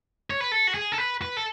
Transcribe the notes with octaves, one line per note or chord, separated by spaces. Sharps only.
C#5
B4
A4
F#4
G#4
A4
B4
B4
A4